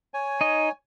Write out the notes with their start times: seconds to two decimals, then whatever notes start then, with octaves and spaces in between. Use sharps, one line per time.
0.14 C#5 G#5
0.41 D#4 D#5